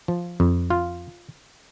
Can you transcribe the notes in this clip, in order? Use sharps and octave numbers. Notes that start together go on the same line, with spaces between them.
F3
F2
F4